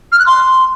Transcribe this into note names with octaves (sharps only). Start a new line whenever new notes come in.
F6
F#6
C6